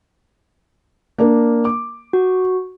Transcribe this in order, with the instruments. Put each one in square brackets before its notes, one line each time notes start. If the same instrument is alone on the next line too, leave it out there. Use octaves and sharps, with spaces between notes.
[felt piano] A#3 D4 A#4
D6
[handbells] F#4